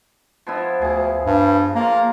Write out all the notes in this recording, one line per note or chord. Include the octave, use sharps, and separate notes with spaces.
F3 B3 E4
D2 G#4
G2
A#3 F4 A#5